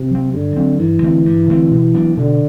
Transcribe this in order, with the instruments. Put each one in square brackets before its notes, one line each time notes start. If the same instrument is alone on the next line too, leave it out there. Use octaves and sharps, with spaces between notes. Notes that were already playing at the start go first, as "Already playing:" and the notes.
Already playing: [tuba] C3
[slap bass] F#3 C4
[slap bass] G2 [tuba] D3
[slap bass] F#3 C4
[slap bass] G2 [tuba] E3
[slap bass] D3 A3 C4
G2
D3 A3 C4
B2
F#3 B3 D4
[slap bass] B2 [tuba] D3